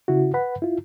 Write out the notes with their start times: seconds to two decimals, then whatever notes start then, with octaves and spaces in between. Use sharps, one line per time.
0.08 C#3 E4 F#4
0.34 B4 F#5 B5
0.62 E4 F4